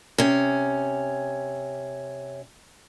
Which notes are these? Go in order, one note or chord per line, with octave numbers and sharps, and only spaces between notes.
C3 C#4